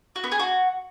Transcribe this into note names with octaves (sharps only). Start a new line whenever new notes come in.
F#4
B3
G#4
F#4